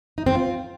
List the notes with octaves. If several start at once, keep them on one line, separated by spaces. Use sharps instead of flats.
D#4
C4
F4